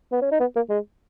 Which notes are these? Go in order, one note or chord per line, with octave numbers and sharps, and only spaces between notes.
B3
C#4
D#4
B3
A#3
G#3